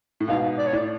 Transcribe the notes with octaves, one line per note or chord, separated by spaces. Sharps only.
A2
G#2 B2 F5
D5
C#5
A2 D5